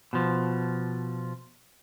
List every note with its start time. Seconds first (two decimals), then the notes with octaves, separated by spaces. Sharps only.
0.13 B2 F3